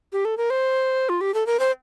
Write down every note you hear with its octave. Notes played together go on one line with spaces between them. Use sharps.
G4
A4
A#4
C5
F4
G4
A4
A#4
C5